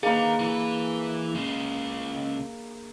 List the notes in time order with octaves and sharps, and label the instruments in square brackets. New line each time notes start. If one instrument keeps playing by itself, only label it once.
[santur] A#3 D4 B4 [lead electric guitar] D#4 A#4 [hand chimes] G#4
[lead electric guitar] E3 B4 [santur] D6
[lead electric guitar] C#3 G#3